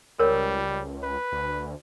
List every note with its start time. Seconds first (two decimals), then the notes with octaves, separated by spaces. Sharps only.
0.19 C#2 G3 A#4 C#5
1.03 B4
1.32 D2